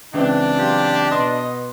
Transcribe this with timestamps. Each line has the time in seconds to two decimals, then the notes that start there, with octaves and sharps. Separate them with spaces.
0.14 C#2 E3 C4 D4
0.59 F#3 F4 G4
1.11 B2 B3 D#5 C6